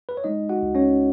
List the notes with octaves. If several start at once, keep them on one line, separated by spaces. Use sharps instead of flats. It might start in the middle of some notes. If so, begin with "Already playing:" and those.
B4
C#5
G#3 D#4 D#5
F#4 F#5
C#2
C#4 C#5